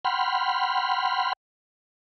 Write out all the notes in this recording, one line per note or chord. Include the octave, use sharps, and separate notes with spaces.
F#5 G5 B5 C6 F6